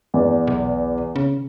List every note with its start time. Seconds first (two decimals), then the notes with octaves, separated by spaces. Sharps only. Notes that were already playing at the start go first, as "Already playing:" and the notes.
0.14 E2 D5
0.47 B1
1.16 C#3